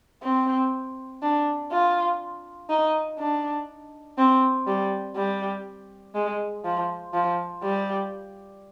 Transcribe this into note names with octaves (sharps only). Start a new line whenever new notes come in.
C4
D4
F4
D#4
D4
C4
G3
G3
G#3
F3
F3
G3